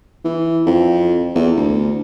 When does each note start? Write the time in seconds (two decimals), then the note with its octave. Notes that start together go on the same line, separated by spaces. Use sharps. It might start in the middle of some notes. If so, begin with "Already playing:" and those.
0.24 E3
0.66 F2
1.35 E2
1.57 D2